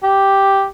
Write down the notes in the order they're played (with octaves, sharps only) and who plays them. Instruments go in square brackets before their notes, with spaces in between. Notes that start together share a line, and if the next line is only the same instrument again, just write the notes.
[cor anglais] G4